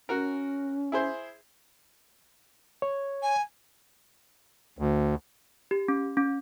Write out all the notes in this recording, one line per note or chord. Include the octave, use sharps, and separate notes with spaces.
C#4 F#4 A#4
E4 G#4 C5
C#5
G#5
D2
G4
C#4
C#4